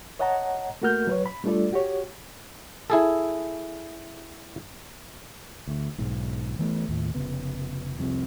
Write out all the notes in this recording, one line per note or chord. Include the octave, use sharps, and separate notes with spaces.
C#5 D#5 F#5 A5 A#5
A3 A#3 F#4 A#4 F6 G6
F#3 B4 C#5
B5
G3 A3 D4 F4 A4 D5
F#4 G4 C#5
E4 G#4 A4
D2
B1 G#2
E3 A3 B3
D#2 A2
F1 D#2 C#3 B3
C2 F2 G#2 C3